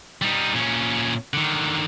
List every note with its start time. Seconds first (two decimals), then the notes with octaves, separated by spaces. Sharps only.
0.22 G3 D#4
0.54 A#2 C#4
1.34 D3 D#3